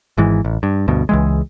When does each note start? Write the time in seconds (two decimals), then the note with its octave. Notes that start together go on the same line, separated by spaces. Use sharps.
0.17 G#1 G#2 E3
0.45 A1
0.63 G2
0.88 D2 G2 B2
1.09 C#2 E3 G#3